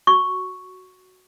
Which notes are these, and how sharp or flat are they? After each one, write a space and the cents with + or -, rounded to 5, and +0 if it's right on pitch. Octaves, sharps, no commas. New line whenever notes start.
F#4 +0 C#6 +0